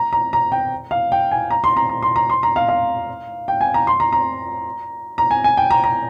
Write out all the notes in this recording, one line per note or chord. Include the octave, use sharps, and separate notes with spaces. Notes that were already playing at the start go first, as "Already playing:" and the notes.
Already playing: A#5
A#5
A#5
G5
F5
G5
G#5
A#5
C6
A#5
A#5
C6
A#5
C6
A#5
F5
F5
G5
G#5
A#5
C6
A#5
A#5
A#5
G#5
G#5
G5
A#5
A#5